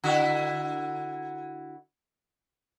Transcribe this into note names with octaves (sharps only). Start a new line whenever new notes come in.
D3 E4 F#4